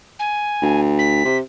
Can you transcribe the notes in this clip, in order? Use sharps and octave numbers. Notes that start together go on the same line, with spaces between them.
G#5
D2
B6
C3